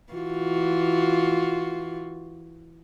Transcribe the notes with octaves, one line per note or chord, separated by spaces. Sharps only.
E3 F4 F#4